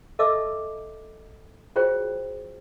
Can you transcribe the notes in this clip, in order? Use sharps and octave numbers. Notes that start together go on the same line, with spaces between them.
A4 D#5 E5 A5 D6 E6
F4 F#4 G#4 C5 C#5 G5